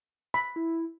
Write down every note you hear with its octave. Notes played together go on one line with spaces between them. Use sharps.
B5
E4